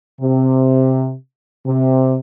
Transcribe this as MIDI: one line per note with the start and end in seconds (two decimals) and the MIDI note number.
0.21 1.13 48
1.65 2.15 48